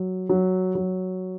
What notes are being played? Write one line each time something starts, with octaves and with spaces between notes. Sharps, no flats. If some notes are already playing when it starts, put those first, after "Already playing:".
Already playing: F#3
F#3
F#3